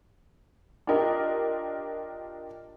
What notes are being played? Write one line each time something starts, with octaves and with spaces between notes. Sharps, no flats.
D4 F4 G4 A#4 D#5